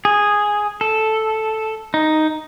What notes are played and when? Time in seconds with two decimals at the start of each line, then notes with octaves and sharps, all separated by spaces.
0.05 G#4
0.81 A4
1.94 D#4